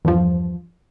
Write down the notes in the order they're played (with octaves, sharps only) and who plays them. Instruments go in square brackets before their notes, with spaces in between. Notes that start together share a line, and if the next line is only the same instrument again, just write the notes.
[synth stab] E2 G2 F3